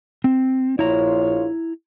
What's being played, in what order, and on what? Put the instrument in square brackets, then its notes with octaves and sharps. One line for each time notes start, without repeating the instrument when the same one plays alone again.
[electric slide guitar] C4
[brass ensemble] A#1 F4 C#5 [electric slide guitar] E4 A#5